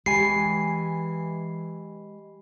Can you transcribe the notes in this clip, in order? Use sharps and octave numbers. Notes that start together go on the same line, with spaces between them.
E3 G#3 G4 G#5 B5 C7